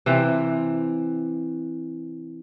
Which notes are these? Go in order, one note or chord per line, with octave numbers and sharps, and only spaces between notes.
C3 E3 C4